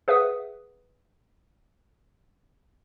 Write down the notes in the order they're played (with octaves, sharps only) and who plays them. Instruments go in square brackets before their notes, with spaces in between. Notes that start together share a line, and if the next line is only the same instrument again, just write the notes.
[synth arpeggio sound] G#4 B4 E5 F#5 D#6